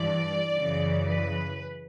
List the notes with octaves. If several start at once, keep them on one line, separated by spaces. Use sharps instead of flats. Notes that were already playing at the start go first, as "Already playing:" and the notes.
Already playing: G2 E3 D5
F#2 C#3 E3
B4